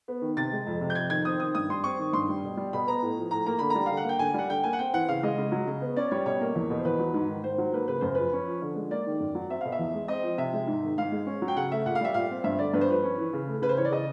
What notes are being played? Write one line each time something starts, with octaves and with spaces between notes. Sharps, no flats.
B3
D#3
C3 A6
G#3
F2
C3
G6
F2 G#6
D#3 G#6
C4 D#6
D#3 D#6
G2 D#6
G3 C6
C4 C#6
D#3
G2 C6
G3
B2
G3
B2 B5
B3 A#5
A2
F3
A2 A#5
A#3 A#5
D3 B5
A#5
G3
D3 F5
F#5
A#3 G5
D3 G#5
G3 F#5
D3 G5
A#3 G#5
F#5
C4 G5
E3 F#5
C#3 F5
G#3 D#5
C#3
F#3
C#3
B3
C#4 D5
G3 C#5
B2 C#5
A#3
E2
B2
C5
E2 B4
F#3
G#2
D#3
G#2 C5
F#3
A#3 B4
C#3 B4
F#2 C5
F3 B4
C#4
F3
D3
G#3
A#3 D5
D#3
F#2
F#3
C4 E5
B2 F5
E5
E2
G#3
C4 D#5
F3
C3 E5
G#3
G#2
D#3
G#2 F5
G#3
C#4
F#3
G5
C#3 F#5
A3 E5
A#2 F#5
F5
G3 E5
A#2 F5
C4
G2 E5
D3 D5
G2 B4
C5
F3 B4
C#4
E3
C#3
A3
C#3 B4
C5
E3 C#5
D5
C#3 D#5